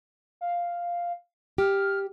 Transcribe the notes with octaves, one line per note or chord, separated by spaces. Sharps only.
F5
G4 F6